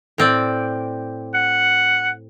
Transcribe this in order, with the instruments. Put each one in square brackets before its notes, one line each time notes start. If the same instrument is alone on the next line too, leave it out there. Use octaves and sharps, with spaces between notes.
[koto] A2 C4 D5
[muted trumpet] F#5